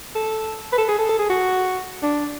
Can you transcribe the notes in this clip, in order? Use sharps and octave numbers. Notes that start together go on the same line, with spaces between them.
A4
B4
A4
G#4
A4
A4
G#4
F#4
D4